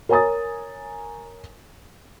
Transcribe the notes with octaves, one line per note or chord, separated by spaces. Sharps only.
A#4 C#5 G#5 A#5 D#6 A6